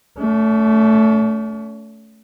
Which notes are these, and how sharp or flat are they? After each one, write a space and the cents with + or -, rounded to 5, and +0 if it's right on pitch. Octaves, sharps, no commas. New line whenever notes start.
A3 +0 C#4 +45